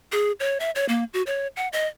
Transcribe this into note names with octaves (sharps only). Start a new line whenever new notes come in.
G#4
C#5
E5
C#5
A#3
F#4
C#5
F#5
D#5